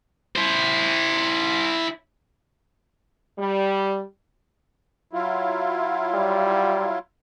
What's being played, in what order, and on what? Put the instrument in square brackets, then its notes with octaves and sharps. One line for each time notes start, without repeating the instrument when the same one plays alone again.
[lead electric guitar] E4 C5
[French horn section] G3
[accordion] F#3 E4 F4
[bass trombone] G3